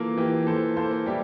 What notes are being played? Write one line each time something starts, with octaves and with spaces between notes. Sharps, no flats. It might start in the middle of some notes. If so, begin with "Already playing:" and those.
Already playing: E3 A#3 F4 A4
E3 G4 A#4
E3 A4 C5
A#3 A4 C5
G3 E4 G4